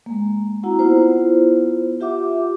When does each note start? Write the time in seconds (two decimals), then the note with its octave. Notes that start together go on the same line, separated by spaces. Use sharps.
0.06 G#3 A#3
0.63 C4 E4 F#4 F#5 A#5
0.79 B3 E4 F4 C5
2.00 F4 G4 E5 F#5 D6